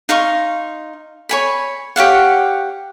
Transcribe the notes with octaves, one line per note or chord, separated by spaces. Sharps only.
D#4 F5 C6 C#6
C#5 G#5 B5
G4 C#5 F5 F#5